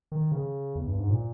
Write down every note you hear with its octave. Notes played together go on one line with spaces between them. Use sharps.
D#3
C#3
E2
G2
G#2
A#2